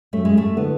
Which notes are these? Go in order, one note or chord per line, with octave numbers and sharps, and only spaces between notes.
F#2 A3
G#3
A3
D3 A3 B3 E4 B4